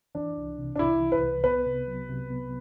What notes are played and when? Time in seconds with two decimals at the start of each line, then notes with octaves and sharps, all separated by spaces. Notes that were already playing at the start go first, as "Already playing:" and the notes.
0.15 E3 D4
0.37 C2
0.58 C3
0.76 D4
0.79 C2 E4
1.01 E3
1.12 B4
1.22 C2
1.44 B3 B4
1.66 C3
1.87 F#3
2.09 C3
2.30 B3